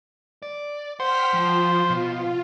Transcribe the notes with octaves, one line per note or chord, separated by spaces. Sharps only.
D5
C5 F#5 G5 F6 B6
F3 F4
B2